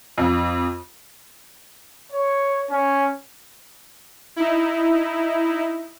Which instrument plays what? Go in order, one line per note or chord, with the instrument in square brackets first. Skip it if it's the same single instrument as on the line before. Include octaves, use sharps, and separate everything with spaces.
[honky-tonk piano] F2
[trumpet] C#5
C#4
[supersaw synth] D#4 E4